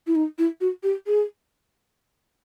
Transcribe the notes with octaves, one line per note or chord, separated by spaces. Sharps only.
E4
D#4
E4
F#4
G4
G#4